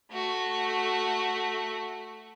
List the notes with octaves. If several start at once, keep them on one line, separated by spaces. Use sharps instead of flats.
A3 F#4